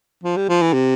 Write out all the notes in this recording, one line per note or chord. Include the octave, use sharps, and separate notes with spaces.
F3
G3
F3
E3
C3